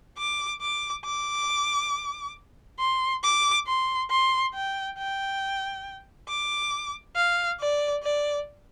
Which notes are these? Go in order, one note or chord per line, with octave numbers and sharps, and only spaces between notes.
D6
D6
D6
C6
D6
C6
C6
G5
G5
D6
F5
D5
D5